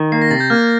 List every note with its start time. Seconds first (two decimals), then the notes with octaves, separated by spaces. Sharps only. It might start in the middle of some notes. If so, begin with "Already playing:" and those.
Already playing: D#3
0.12 A#3 C7
0.22 A#6
0.31 C3 A6
0.40 G6
0.50 A#3 F6